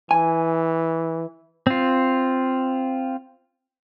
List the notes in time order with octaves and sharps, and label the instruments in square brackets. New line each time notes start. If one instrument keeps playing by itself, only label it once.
[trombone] E3 [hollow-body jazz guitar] G#5
[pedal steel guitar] C4 F4